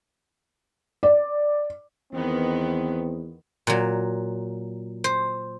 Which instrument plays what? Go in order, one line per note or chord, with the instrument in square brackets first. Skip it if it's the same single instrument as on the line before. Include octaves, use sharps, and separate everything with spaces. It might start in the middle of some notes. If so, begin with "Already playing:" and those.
[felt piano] D5
[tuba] E2 [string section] D#3 B3 [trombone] C4
[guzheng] A#2 F#3
C5